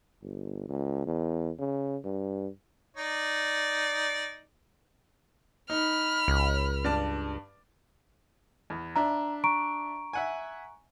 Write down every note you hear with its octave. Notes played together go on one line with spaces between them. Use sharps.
G1
C#2
E2
C#3
G2
D#4 D5
D#4 B5 F6
C#2
G2 D5 A5
E2
D4 E5 A#5
A#5 C#6 D7
E5 F#5 G#5